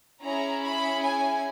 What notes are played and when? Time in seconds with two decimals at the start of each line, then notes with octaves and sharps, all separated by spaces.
0.21 C#4 E4 G#4 A#5
0.63 B5
1.03 G#5